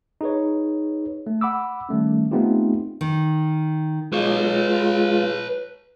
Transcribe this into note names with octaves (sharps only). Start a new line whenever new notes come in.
D#4 G#4 B4 C#5
A3
F#5 B5 D6 E6
D#3 G3 A3 C#4
A3 B3 C4 D#4 F4 G4
D#3
G#3 F4 B4 C#5